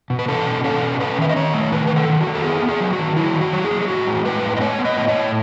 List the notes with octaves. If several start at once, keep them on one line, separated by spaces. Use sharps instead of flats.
B2
B4
C#4 A4
B2
C#4 A4
B2
C#4 B4
D#3 E5
D#5
D#3 C#5
A3
D#3 B4
D#3 B4
A4
D#3
F#4
D#3
A4
B3 G#4
B3
G#4
F#3
F#4
D#3
F#3 E4
D#3
F#4
F#3
G#4
F#3
G#4
A2 F#4
G#3
A2 B4
G#3
D#5
B3 C#5
B3
D#5
A2
C#5
A2